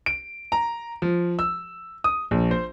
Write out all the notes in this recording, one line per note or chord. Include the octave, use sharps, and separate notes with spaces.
D7
A#5
F3
E6
D#6
A#1
C5